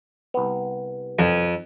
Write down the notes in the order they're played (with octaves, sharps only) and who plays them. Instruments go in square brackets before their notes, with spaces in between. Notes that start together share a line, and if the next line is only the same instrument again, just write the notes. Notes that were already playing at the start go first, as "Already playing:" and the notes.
[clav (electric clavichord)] C2 B3
[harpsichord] F2